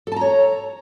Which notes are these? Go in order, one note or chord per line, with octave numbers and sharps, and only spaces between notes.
A4 C#5 A5 A#5